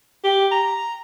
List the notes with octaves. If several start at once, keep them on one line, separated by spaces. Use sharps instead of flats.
G4
A#5